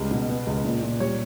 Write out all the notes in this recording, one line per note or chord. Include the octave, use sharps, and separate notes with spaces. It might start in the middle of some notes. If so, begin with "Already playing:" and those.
Already playing: C#2 G3
B2
B3
C#2
A#2
A#2
G3 C#5